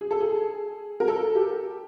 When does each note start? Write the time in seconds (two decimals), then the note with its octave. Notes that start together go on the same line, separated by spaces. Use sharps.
0.01 G#4
0.11 A4
0.20 G#4
1.00 A#4
1.08 A4
1.35 G4